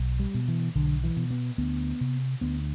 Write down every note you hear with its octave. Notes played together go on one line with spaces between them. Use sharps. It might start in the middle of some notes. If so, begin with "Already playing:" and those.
Already playing: B1
G3
B2
E3
B1 D3
E3
B2
B3
D2 B3
C3
D2 B3